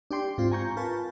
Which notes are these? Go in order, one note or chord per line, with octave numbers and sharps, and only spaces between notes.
D4 G4 D5 G5 C6
G#2 C4 F4
G#5 A#5 C#6 G6
F4 A#4 B4 A5